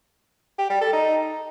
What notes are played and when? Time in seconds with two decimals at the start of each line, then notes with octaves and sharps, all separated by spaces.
0.58 G4
0.70 G3
0.81 A4
0.93 D#4